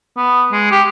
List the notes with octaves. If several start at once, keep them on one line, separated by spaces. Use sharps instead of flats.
B3
G#3
G4